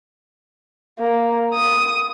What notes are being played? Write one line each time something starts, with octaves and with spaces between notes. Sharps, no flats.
A#3
D#6